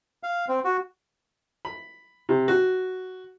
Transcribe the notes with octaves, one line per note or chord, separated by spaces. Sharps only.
F5
C4
F#4
B5
C3
F#4